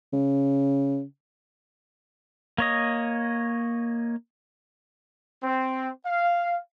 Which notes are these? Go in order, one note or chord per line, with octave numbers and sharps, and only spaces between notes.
C#3
A#3 C#5 D#5
C4
F5